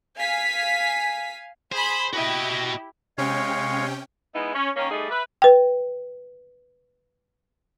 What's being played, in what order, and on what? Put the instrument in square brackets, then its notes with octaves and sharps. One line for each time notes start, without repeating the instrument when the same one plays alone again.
[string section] F5 G#5 B6
[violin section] G#4 B5 [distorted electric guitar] C5
[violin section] E4 G4 [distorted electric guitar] F#4 D#5
[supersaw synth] C3 C#4 G5 [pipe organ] G#3 C#5 F5
[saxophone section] G#3 B3 D#4 E4
C#4
D#3 A#3 C#4
G3 A3 D#4 G#4
B4 E5
[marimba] B4 G5